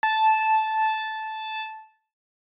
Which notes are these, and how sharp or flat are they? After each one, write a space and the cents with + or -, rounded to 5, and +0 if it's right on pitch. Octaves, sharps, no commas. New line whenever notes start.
A5 -10